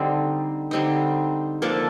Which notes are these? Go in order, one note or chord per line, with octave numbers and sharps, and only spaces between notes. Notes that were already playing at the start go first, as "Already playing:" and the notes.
Already playing: D3 G3 C4 D#4
D3 G3 C4 D#4
F3 A#3 D4 A4